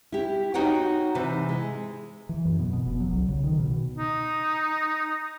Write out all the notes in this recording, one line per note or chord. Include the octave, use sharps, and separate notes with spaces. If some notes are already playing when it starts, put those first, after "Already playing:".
E4 G4
D#4 F#4 C#5 F#5 G5
C3 E3
G#3
E3
F#2
B2
B2
F1
F#3
C2
C#3
D#3
B2
D#4